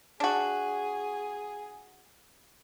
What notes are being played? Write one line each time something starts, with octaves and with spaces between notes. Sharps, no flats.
D4 F#4 G#4